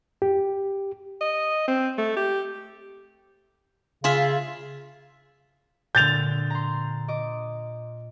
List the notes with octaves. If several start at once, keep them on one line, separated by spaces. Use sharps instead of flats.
G4
D#5
C4
A3
G4
C#3 F4 G#4 E5
A#2 D3 G6 A6 F7
A#5 C6
D#5 D6